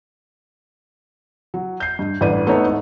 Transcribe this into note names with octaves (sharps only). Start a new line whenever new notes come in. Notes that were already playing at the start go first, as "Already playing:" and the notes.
F#3
G6 C7
G2
A1 G2 B4 D5 D#7
A3 B3 D#4 A4 C#5
G#2